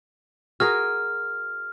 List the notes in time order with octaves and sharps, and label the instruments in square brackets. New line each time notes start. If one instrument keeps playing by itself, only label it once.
[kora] F#4 G#4 A#4 [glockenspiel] F6